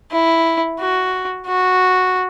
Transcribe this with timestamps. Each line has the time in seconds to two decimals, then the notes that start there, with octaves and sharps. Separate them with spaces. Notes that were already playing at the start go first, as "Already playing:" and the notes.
0.12 E4
0.79 F#4
1.47 F#4